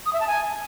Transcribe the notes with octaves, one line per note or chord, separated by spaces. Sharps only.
D#6
E5
A5
G#5